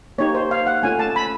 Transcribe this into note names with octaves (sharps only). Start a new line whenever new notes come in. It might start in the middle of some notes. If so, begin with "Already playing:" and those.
A#3 D#4 G4 C#5
C5
F5
F#5
A3 C#4 F4 G#5
A5
B5